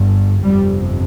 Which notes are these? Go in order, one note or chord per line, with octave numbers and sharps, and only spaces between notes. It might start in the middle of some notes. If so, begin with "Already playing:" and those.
Already playing: G1 G2
G1 F2 C3 G3